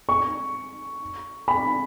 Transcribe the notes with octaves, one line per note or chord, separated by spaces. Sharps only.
C#6
B5